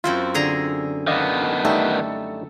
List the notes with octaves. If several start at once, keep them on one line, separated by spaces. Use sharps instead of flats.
F#2 C4 E4 F4
D3 G#4 A#5
D#3 B3 D5 D#5 F5
G3 A3 D#4 A4